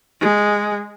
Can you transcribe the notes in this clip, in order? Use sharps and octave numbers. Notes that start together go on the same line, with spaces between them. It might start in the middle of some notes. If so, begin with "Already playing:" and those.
G#3